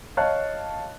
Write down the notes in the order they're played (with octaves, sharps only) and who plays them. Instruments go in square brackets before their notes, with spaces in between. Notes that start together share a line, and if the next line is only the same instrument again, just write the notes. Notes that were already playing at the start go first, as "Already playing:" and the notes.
[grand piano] C#5 D#5 F5 A5 F#6